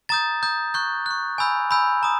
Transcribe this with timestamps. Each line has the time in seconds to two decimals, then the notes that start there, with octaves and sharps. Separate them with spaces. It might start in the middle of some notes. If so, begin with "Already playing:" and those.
0.09 A#5 D#6 G6 A6
0.43 A#5 D#6 G6
0.74 C#6 F#6 G6
1.06 C#6 F#6
1.38 G#5 B5 E6 G6
1.71 G#5 B5 E6 G6
2.03 A#5 D#6